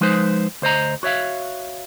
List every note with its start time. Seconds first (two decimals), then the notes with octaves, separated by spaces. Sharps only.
0.01 F3 G#3 D#4 B4 C5
0.62 D2 C5 D#5 A#5
1.03 F#4 C#5 E5 F5